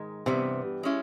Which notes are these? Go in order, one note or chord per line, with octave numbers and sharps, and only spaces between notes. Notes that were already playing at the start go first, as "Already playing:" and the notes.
Already playing: G#2 D#3 G#3
G2 C3 E3 G3 B3
G#3 C#4 E4